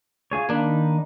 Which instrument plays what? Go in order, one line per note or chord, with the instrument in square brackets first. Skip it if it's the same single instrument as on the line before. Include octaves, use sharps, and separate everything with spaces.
[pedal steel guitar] F4 G#4 C#5
[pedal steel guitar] D#3 D#4 B5 [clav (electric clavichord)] A#3 D4